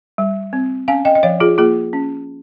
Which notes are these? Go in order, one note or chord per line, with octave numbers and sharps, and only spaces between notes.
G3
C4
C#4 F5 G#5
D#5 G5
D#5
F3 C#5 F5
F4 G#4
A#3 F4 G#4
C#4